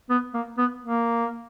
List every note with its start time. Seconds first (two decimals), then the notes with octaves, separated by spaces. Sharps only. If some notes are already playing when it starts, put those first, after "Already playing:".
0.09 B3
0.34 A#3
0.57 B3
0.82 A#3